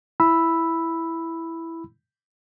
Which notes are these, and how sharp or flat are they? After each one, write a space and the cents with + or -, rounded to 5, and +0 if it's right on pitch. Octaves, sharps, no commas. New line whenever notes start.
E4 +0 B5 +0 E6 +0